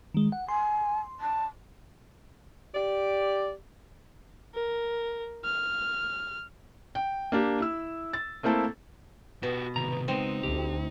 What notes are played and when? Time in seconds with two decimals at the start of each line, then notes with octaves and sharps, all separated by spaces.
0.14 D#3 G#3
0.32 F#5
0.49 G#5 C6
1.20 A5
2.75 G4 D5
4.55 A#4
5.45 F6
6.95 G5
7.32 A#3 D4 G4
7.60 E4 E6
8.13 A6
8.43 A3 A#3 C4 E4 A4
9.43 B2 F#4 G4
9.76 C3 D#3 A#5
10.08 C#2 G#3 B3 C4 D#4
10.43 D2 G4